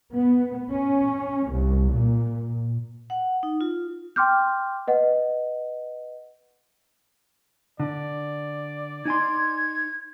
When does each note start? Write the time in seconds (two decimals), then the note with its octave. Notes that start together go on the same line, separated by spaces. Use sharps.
0.14 B3
0.70 C#4
1.51 C2
1.94 A#2
3.10 F#5
3.43 D#4
3.61 F4
4.16 G5 C6 D6 F6 G6
4.88 B4 D#5 F#5
7.80 D3 D5
9.05 D#4 G#5 C6 G#6